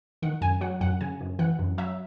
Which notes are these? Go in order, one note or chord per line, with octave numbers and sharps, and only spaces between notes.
D#3 F#5
F#2 G#5
F#3 F#5
F#2 F#5
C#3 G#5
F#2
E3 F#5
F#2
F#3 E5